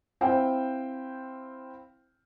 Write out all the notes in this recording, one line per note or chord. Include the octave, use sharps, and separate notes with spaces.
C4 E4 C5 F5 G5